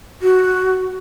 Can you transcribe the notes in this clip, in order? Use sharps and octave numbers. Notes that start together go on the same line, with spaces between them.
F#4